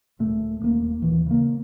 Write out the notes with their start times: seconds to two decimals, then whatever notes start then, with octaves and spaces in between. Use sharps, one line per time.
0.19 D1 A#2 A3
0.60 D#1 A#3
1.02 D#2 A#2 E3
1.26 C#3 A#3